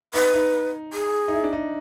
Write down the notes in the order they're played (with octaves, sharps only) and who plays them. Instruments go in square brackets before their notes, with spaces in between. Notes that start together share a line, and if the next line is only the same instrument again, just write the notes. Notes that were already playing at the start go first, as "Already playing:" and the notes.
[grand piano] D#4 [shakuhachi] B4
[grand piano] D#4
[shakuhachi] G#4
[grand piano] D#4
E4
D4
D#4